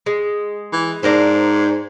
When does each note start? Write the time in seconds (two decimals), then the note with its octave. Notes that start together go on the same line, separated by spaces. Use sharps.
0.06 G#3
0.73 E3
1.03 G#2 D4 A#4 C5